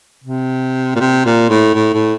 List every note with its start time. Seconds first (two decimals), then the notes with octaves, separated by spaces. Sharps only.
0.24 C3
0.95 A#2
1.00 C3
1.25 A#2
1.49 A2
1.74 A2
1.94 A2